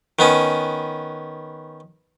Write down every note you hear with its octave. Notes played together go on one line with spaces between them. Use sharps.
D#3 B3 C#4